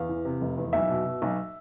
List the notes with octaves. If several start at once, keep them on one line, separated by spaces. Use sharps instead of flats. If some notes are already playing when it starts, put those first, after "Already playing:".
Already playing: E2 F5
E3
C3
F1
E2
B1 E5
B2
B2
B1